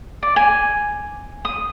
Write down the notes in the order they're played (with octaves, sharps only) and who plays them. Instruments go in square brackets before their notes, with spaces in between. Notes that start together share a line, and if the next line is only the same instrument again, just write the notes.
[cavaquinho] D5
G#5
D#6